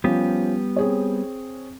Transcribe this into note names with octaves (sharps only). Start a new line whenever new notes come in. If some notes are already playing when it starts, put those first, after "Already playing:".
F3 G3 B3 C#4 G4
C4 G#4 C#5